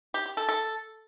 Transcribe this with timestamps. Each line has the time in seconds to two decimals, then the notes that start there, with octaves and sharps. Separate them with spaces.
0.14 G4
0.26 G4
0.37 A4
0.49 A4